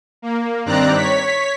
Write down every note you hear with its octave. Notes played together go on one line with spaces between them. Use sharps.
A#3
G2 D#3 C4 D5 A#5 F#6
C#5 B6